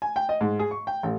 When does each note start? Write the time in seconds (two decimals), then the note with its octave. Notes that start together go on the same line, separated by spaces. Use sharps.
0.02 G#5
0.16 G5
0.29 D#5
0.41 G#2
0.59 G#4
0.71 C#6
0.87 G5
1.03 A1